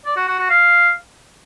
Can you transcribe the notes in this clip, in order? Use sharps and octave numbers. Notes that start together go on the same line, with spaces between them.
D5
F#4
F#4
F#4
F5